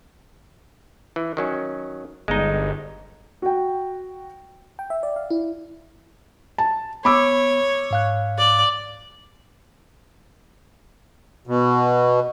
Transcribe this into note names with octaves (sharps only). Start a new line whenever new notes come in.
E3
D#3 F#3 C#4
G1 G#3 D#4
F#4 G5
G5
E5
D5
F5
E4
A5
B3 C#5 B5 D6 E6
G#2 F5 F#6
D5
B2